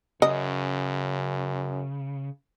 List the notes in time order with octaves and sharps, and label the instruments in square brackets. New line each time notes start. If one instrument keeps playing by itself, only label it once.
[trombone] F#2 [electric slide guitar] C#3 [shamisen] D#5